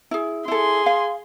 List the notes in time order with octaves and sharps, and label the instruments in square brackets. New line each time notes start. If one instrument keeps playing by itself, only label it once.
[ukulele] E4 G#4
[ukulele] E4 A4 [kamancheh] G#4 C6
[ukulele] F5